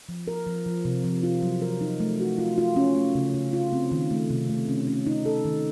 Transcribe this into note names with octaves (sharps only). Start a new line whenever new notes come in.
F3
A#4
F3
F3
C3
F3
F4
F#3
A#4
D#4
A3
F#4
F4
F4
C#4
A3
C#3
C#3
F4
C4
D#3
A3
C3
A3
C#4
C#4
D#4
A4
D#3